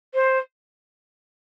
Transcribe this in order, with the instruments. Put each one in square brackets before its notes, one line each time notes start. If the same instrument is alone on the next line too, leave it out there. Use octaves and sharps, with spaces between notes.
[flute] C5